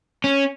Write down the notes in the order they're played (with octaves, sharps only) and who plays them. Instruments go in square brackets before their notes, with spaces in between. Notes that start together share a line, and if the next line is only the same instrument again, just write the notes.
[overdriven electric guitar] C#4